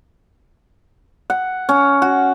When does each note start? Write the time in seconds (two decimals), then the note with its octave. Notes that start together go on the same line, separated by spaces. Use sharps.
1.30 F#5
1.69 C#4
2.02 F#4